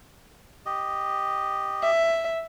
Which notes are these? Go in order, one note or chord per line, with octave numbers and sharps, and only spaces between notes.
G4 D#5
E5